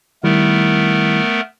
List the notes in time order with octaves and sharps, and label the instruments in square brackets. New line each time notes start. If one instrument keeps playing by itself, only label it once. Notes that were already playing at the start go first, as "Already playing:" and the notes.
[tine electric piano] D#3 G3 E4 [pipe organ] A3 B3 A#4